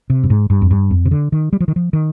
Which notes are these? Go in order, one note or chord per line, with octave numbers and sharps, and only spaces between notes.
C3
G2
G#2
G2
F2
G2
F2
C3
D3
D#3
G3
F3
D#3
F3
D#3